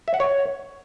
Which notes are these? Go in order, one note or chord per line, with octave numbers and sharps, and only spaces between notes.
E5
F#5
C#5